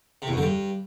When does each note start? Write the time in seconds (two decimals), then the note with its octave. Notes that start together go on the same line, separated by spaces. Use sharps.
0.22 C3
0.27 E2
0.32 F#2
0.37 D3
0.42 G2